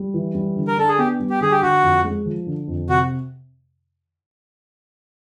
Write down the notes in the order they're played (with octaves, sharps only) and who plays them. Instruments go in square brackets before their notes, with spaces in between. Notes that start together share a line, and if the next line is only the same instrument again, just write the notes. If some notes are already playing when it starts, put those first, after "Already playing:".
Already playing: [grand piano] G3
E3
G3
D3
[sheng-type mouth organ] A#4
[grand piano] D4 [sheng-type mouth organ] A4
[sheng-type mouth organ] G#4
[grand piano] B3 [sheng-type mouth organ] G4
[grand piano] G3
[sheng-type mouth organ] G4
[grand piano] D3 [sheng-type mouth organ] G#4
[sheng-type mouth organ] G4
[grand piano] D3 [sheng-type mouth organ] F#4
[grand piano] F2
G#3
F3
D3
F2
[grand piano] C3 [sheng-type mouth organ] F#4